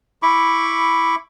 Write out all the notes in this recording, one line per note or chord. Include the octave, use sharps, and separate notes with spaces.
E4 B5 C#6 D6